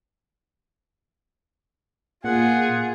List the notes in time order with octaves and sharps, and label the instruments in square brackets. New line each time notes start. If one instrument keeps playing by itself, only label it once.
[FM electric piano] A#2 [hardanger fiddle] F4 G#4 [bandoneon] F#5